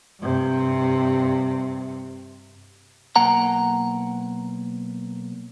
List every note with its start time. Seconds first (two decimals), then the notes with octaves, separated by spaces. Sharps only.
0.20 G2 C3
3.16 B1 A#3 F#5 A#5